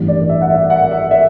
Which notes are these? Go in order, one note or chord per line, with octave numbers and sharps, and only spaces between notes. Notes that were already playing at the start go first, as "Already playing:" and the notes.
Already playing: A1 G2 E3
D5
E5
F#5
E5
F#5
E5
E5